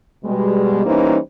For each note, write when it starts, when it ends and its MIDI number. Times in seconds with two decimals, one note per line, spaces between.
0.24 0.84 47
0.24 0.84 55
0.24 0.84 56
0.86 1.17 52
0.86 1.17 55
0.86 1.17 58
0.86 1.17 61
0.86 1.17 63
0.86 1.17 72